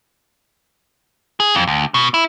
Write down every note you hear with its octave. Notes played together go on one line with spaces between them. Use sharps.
G#4
F2
D2
B2
E4